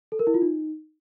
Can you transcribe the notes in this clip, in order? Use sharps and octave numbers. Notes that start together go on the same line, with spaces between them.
A4
A#4
E4
F4
D#4